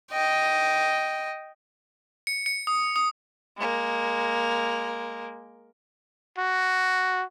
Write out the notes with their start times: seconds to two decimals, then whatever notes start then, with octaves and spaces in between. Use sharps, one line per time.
0.12 D#5 G5
2.27 C#7
2.46 C#7
2.67 D#6
2.96 D#6
3.58 G#3 A#3
6.39 F#4